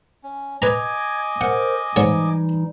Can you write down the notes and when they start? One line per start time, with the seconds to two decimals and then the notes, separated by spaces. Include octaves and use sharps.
0.23 C#4
0.62 B4 D#5 G#5 A#5 D6 G#6
1.41 A#4 C5 F#5
1.96 G#2 E3 G3 D#4 C#5